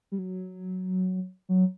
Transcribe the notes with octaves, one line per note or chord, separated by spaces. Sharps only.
G3
F#3
F#3